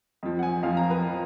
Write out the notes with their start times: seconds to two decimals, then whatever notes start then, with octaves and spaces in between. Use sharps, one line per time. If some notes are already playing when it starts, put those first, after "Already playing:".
0.23 F2 F3
0.39 F#5
0.43 G#5
0.63 F2 F3 F5
0.77 A#5
0.90 B4
1.08 F3